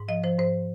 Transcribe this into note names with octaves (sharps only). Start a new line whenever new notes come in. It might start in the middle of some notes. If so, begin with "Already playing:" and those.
Already playing: G#2
F3 D#5
F3 C5
G#2 C5